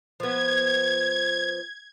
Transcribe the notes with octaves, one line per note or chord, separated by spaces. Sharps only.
F3 B3 G#6